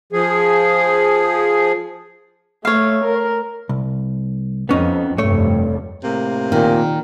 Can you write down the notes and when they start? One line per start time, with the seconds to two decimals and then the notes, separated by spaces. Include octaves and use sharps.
0.13 F3 G#4
2.65 A3 C#5 F5
3.04 A#4
3.69 C2
4.69 F2 B3 C#4 D#4
5.18 F1 G2 A3 C#5
6.04 A2 C3 A#3
6.52 A#2 D#3